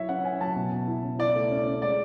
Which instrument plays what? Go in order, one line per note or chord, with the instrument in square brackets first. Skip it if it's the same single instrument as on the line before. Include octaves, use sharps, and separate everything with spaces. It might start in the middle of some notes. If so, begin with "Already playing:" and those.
Already playing: [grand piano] F#3 E4 [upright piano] C#5 E5
[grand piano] C#4 [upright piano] F#5
[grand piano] C#4 [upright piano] G#5
[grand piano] F#3 [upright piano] A5
[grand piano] B2
B2
E4
C#4
[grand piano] E4 [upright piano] D5
[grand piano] A3
C#4
C#4
[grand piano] G#3 [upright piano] D5